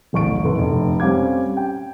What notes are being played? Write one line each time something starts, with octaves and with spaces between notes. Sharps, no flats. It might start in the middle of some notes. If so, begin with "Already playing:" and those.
D1 A1 C#6 D7
F#1 A4 B4 C6
F1
G3 C4 C#4 F5 D6 G#6
G5